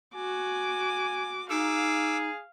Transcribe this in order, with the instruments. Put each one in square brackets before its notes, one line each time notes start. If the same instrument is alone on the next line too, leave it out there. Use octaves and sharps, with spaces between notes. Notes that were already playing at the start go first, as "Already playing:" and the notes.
[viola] F#4 D6 [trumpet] G#5
[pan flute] D#4 [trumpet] G#4 [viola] F5 [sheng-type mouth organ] D6 E6